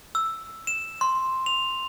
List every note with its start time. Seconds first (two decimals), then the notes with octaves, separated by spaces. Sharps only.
0.15 E6
0.67 E7
1.01 C6
1.46 F7